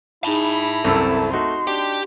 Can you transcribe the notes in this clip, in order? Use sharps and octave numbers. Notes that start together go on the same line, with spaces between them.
D#4 E4 G#4 A5 B5
C2 F#2 C4 A4 E6
A3 D#4 F#4 C6
D4 G4 G5